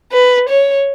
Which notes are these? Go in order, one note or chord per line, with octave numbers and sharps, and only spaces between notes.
B4
C#5